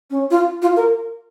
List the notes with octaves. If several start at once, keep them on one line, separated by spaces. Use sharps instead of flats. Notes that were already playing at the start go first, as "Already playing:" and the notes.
C#4
F4
F4
A#4